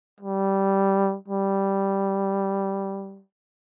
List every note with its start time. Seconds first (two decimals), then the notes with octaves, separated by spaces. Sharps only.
0.20 G3
1.28 G3